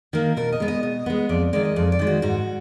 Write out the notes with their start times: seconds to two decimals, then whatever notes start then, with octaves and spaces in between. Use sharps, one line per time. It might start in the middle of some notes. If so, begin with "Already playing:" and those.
0.13 D#3 A#3 A#4
0.37 B2 A#4
0.52 D#5
0.60 G#3 B3
0.68 D#5
0.83 B2 D#5
1.06 G#3 B3
1.29 F2 D5
1.53 D#3 G#3 D5
1.65 D#5
1.76 F2 D5
1.92 D5
1.99 D#3 G#3
2.07 F#4
2.22 G#2 F#4